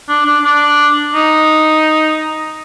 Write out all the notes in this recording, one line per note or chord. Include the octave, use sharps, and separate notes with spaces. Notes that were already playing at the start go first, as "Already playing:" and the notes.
D4
D4
D4
D#4